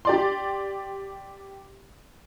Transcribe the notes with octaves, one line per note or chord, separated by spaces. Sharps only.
G4 D5 C6